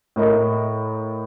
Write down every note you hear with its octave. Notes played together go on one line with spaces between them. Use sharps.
A2 A#4 D#5